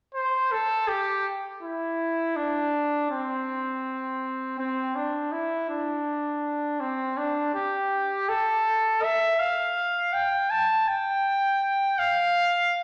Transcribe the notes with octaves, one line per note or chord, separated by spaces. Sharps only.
C5
A4
G4
E4
D4
C4
C4
D4
E4
D4
C4
D4
G4
A4
E5
F5
G5
A5
G5
F5